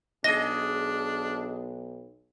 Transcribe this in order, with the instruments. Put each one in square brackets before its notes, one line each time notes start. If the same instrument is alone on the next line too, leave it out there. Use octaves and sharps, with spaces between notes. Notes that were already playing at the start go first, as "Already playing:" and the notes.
[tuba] B1 [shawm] D4 [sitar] G#4 D#5 [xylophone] A#6